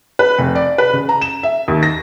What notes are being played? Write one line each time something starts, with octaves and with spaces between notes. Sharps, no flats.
B4
F1
D5
B4
C#3
A#5
E7
E5
D#2
A#6